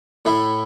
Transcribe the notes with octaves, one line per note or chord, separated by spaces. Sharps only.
A2 A3 E4